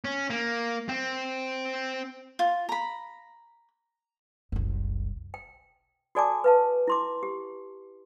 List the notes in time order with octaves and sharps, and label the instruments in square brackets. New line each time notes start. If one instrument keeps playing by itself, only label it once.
[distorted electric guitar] C#4
A#3
C4
[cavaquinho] F4
A#5 B5
[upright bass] F#1 C2
[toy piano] G5
F#4 A4 D5 G#5 A5 D6
B4 F5 A5
E4 C6 D6
G4